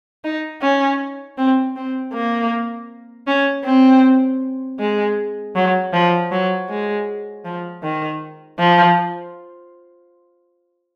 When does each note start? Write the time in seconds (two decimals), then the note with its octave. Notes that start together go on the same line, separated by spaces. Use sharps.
0.24 D#4
0.62 C#4
1.38 C4
1.76 C4
2.14 A#3
3.27 C#4
3.65 C4
4.79 G#3
5.56 F#3
5.93 F3
6.32 F#3
6.70 G#3
7.45 F3
7.83 D#3
8.59 F3